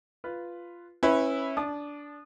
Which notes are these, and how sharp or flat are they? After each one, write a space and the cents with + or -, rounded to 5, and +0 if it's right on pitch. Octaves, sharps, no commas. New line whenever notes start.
F4 -10 B4 +0
C#4 -25 E4 -10 B4 +0
D4 -10 A5 -20 D#6 -30